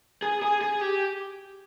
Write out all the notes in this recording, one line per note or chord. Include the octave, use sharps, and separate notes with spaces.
G#4
G#4
G#4
G4